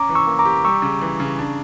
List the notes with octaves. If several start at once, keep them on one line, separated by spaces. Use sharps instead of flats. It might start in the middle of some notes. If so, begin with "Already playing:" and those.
Already playing: C#4 A#5 D6
E3
C#6 E6
A#3
A#5 D6
G4
G3 C#6 E6
C#3
E3
C#3
D4